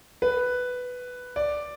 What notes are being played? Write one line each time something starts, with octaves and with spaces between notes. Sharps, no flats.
B4
D5